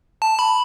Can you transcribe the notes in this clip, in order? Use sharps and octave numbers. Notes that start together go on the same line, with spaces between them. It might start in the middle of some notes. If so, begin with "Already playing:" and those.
A5
B5